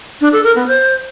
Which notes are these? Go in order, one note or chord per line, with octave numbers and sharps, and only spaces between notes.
D4
A4
A#4
B3
C5